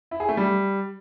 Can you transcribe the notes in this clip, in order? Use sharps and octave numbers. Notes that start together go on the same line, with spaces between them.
E4
G#4
A3
G3